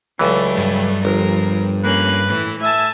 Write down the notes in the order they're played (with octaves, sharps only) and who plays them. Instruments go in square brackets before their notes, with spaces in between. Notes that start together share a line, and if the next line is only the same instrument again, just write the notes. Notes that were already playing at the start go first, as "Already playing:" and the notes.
[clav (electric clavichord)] C#2 E3 [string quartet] F#3 G3 A3
[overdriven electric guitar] G2
[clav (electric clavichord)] G1 [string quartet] F3 A#4
[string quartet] A#3 C#4 F#6 [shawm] B4
[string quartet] A2 E3
[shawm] E5 [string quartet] G#5 A5